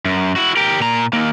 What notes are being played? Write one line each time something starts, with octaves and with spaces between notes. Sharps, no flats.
F#2
E4 F#4
G4 A#4
A#2 A#5
D#2 A#3